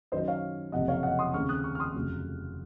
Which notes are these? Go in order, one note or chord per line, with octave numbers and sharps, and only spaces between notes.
F#2 D#3 F#3 C5 D#5
C#5 F5
F#1 F2 C3 D#5 F#5
C#5 F5
D#5 F#5
C6 D#6
D#2 C#3 A3 C4 C#6 F6
D#6 F#6
C#6 F6
F6
C6 D#6
F1 F2 C#3 F#3 A3